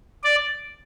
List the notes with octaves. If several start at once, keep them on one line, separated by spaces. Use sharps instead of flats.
D5